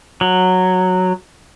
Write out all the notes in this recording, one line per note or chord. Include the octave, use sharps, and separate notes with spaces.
F#3